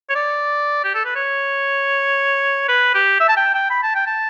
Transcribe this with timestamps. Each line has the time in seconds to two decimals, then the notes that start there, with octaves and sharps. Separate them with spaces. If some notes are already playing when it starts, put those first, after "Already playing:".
0.10 C#5
0.15 D5
0.84 G4
0.95 A4
1.06 B4
1.16 C#5
2.68 B4
2.95 G4
3.20 E5
3.29 A5
3.37 G5
3.54 G5
3.71 B5
3.83 A5
3.95 G5
4.07 A5